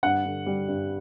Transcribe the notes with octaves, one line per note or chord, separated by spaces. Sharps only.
G2 F#5
D3
G3
G2